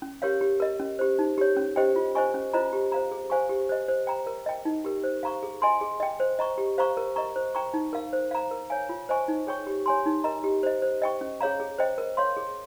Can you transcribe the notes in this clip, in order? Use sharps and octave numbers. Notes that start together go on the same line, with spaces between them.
C#4
G4 A#4 C#5 F5
G4
A#4 D#5
C#4
G4 C5
D#4
G4 C#5
C#4
G4 C5 D#5 G5
F4
C5 D#5 G#5 C#6
C#4
F4 C5 D#5 A#5
G4
C5 F5 A#5
G#4
C5 F5 G#5 C#6
G4
C5 D#5
C5
G5 A#5
A#4
D#5 G5
D#4
G4 A#4
C5
F5 A#5 C#6
G#4
D#5 G#5 C6
G#4
D#5 G5
C5
D#5 A#5 C#6
G4
C5 F5 A#5 C#6
A#4
D#5 A#5 C#6
C5
G5 A#5 C#6
D#4
A#4 F5
C5
F5 A#5
A#4
C#5 F5 G#5
F4
C5 D#5 G#5 C#6
D#4
G#4 C#5 G5 C#6
G4
C#5 G#5 C6
D#4
A#4 D#5 A#5
G4
C5 D#5
C5
D#5 G5 C#6
C#4
G#4 C#5 F5 A#5
G#4
C5 D#5 G5
A#4
C#5 F5 C6
G#4